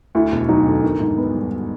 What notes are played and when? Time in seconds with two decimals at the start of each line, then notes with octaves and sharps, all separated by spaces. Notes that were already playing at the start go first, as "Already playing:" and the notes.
0.15 D2 E4
0.32 E1
0.49 F#3 D#4
0.66 D3
0.83 D#3
1.00 G#2
1.18 B3
1.35 G3